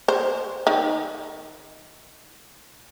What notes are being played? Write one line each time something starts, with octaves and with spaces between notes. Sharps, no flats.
C5
D#3